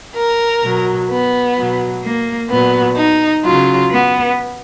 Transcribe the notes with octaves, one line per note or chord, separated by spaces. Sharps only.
A#4
B2 F#3
B3
B2 F#3
A#3
A#2 F#3 B3
D#4
C#3 F#3 F4
B3